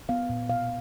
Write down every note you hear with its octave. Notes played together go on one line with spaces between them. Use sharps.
B3 F5
A#2
B2 F5